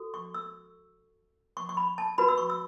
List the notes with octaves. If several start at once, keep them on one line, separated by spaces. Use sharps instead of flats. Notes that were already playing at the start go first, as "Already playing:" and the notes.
Already playing: F#4 A4
C#6
E6
C#6
C#6
B5
A5
F#4 B4 B5
E6
C#6
E6